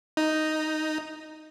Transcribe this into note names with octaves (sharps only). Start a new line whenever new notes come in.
D#4